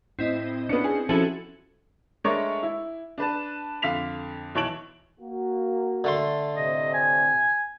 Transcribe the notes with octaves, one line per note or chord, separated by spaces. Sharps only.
A2 C4 E4 D#5
B3 C#4 D4 C#7
G#4
F3 C#4 E4 F#4 G#4 A4
G#3 A3 D4 A#4 C#5 D5
E4
D4 B4 A5
F2 D3 F5 B6 F7
B1 E3 C#5 A5 D7 F#7
A#3 F#4
D3 A3 C6
A2 C3 D#5
G#5